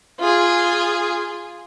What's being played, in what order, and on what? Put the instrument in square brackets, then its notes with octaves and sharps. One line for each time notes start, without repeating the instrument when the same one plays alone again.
[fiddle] F4 G#4